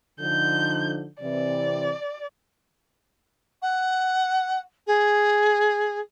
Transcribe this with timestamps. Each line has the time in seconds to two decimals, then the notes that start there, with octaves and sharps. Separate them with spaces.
0.20 D3 F3 D#4 G6
1.22 C3 E3 C4 D5
3.62 F#5
4.86 G#4